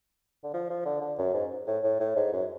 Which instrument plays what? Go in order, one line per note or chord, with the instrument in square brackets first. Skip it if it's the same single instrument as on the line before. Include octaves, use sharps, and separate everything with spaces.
[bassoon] D3
F3
F3
D3
D3
F#2
G#2
A2
A2
A2
G#2
F#2